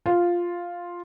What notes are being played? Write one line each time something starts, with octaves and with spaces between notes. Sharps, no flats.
F4